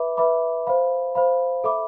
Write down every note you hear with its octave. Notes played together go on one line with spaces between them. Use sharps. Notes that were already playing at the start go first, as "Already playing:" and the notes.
Already playing: B4 E5 B5 D6
B4 E5 B5 D6
C5 F5 B5
C5 F5 B5
A4 E5 B5 D6